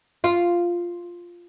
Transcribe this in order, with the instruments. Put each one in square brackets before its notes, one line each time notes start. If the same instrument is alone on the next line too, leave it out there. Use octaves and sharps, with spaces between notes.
[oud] F4